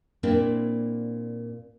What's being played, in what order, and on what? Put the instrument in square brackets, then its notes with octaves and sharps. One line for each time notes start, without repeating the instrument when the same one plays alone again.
[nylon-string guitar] A#2 A#3 C4 D4 E4